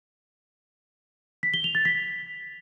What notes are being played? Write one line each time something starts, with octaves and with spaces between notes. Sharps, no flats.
B6
G7
F7
A6
B6